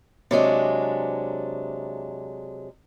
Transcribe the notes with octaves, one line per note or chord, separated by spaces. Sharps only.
C3 F#3 G#3 D4